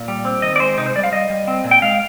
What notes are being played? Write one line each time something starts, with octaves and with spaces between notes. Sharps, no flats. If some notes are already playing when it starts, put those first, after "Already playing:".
Already playing: A#2
G3
C4
D#3 D#5
D5
G#3 C5
C3 D#4
C5
G3 D5
F5
G3 D#5
G3
C4
A#2
G5
G#3 F5